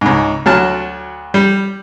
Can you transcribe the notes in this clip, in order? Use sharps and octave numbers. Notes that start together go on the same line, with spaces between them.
C#2 G#2
D2 F#3 A5 F6
G3